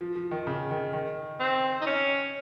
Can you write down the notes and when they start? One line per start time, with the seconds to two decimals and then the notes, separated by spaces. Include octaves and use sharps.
0.01 F3
0.15 F3
0.31 D#3
0.47 C#3
0.71 D#3
0.93 D#3
1.40 C4
1.81 D#4
1.86 C#4